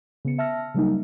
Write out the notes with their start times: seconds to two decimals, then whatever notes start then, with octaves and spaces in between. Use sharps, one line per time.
0.25 C#3 B3 C#7
0.38 E5 A5 E6 F6 A#6
0.74 C#3 F#3 G3 A#3 D#4